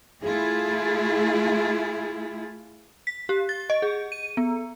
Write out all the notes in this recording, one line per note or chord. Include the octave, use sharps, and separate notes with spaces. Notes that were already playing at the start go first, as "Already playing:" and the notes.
A3 E4 F4 G#4
B6
G4
A6
D#5
G#4
D#7
B3